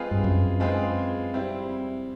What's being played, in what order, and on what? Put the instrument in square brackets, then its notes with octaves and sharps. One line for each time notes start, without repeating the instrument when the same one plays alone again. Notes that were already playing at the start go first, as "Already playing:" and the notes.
Already playing: [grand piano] G#3 C4 F4 G#4 B4
[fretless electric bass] G2
F#2
[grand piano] G#3 C4 F4 G#4 B4
G3 C4 E4